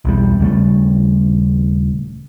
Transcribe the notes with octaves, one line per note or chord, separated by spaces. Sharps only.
B1 E2 G3
D#1 C#3 G3 A3